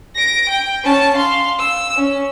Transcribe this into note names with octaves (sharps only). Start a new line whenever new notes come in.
A#6 D7
G5
C#4 A5
F5 C6
E6
C#4